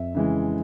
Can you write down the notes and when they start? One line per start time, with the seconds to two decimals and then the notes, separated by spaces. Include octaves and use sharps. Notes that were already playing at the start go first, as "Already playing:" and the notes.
Already playing: F2 E5
0.15 C#3 E3 G#3